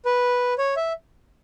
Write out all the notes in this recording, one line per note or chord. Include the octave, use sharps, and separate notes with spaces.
B4
C#5
E5